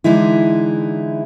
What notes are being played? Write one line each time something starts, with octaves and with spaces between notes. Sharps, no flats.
D3 E3 G#3 D#4 E4